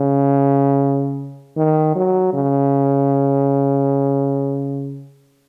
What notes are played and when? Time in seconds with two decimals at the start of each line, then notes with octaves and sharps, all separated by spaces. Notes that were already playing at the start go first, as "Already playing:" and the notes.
Already playing: C#3
1.57 D#3
1.96 F#3
2.33 C#3